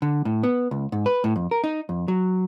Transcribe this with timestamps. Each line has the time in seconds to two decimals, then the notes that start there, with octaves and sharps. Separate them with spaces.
0.02 D3
0.25 A2
0.43 B3
0.71 C#2
0.92 G#2
1.06 B4
1.24 A2
1.36 F2
1.51 A#4
1.64 D#4
1.89 F2
2.08 F#3